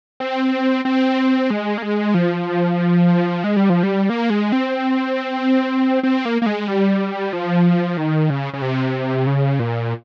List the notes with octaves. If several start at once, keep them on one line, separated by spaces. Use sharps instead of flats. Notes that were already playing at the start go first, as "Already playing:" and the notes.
C4
C4
G#3
A#3
G#3
F3
G#3
G3
F3
G3
A#3
G#3
C4
C4
A#3
A#3
G#3
G3
F3
D#3
C#3
C#3
C3
C#3
A#2